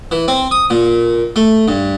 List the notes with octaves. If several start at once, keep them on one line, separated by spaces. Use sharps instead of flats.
E3
C4
D#6
A#2
A3
G2